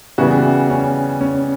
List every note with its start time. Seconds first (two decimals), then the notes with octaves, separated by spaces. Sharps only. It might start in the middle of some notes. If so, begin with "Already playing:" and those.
0.18 C#3 E3 G3 B3 E4 F#4
0.70 C#4
1.21 C#4